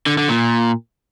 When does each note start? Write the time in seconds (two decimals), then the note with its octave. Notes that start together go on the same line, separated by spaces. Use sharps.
0.06 D3
0.18 D3
0.29 A#2